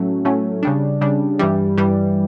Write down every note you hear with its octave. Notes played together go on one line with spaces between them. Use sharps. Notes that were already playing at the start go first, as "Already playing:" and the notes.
Already playing: A2 F#3 A3 C#4
A2 F#3 A3 C#4
C#3 G3 D4
C#3 G3 D4
G2 E3 G3
G2 E3 G3